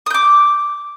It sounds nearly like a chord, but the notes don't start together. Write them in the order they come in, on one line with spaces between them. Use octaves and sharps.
D#6 G6 D6